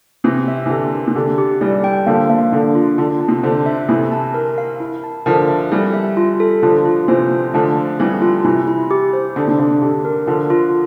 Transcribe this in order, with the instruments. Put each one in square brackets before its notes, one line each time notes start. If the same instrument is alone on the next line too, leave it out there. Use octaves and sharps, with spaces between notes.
[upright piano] C3 E3 [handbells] C4
[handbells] E5
[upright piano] E3
[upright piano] D3 [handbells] G4
[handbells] A#4
[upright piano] C3
[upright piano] D3 [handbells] G4
[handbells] G4
[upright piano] E3 G3 [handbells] D5
[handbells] G5
[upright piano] D3 F3 [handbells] A#3
[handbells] A#3
[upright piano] D3 [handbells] D4
[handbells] F4
[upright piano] D3 [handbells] F4
[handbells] A5
[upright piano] C3
[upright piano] D3 [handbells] C5
[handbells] E5
[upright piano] C3 E3 [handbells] E4
[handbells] A5
A#4
F5
E4
A5
[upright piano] D3 F3 [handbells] A#4
[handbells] E5
[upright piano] E3 G3 [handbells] C4
[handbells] E5
F4
A4
[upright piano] D3 F3 [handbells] F4
[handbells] F4
[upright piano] C3 E3 [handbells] C5
[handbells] G5
[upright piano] D3 F3 [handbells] A3
[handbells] A3
[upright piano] E3 G3 [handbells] C4
[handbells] F4
[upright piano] C3 E3 [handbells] E4
[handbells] E4
G4
C5
[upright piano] D3 [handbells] D4
[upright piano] C3
[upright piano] D3 [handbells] F5
[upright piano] D3 [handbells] G4
[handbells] A#4
[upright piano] D3 F3 [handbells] F4
[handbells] F4